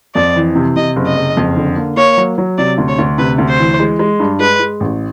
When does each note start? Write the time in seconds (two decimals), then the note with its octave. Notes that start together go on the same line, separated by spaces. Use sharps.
0.15 F2 D5
0.36 E3
0.55 C3
0.76 C3 D#5
0.96 F#1
1.06 D#5
1.16 F#1
1.37 F2
1.56 D3
1.76 A#3
1.97 A#3 C#5
2.17 F#3
2.38 F#3
2.58 C3 D5
2.78 D2
2.88 C#5
2.99 D2
3.18 C3 B4
3.38 D2
3.49 C5
3.59 E3
3.79 G#3
3.99 G#3
4.20 G2
4.40 G#3 B4
4.60 G#3
4.80 A1